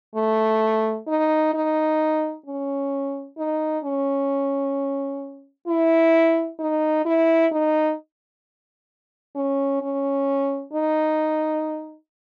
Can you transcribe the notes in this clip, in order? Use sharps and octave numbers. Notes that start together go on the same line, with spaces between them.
A3
D#4
D#4
C#4
D#4
C#4
E4
D#4
E4
D#4
C#4
C#4
D#4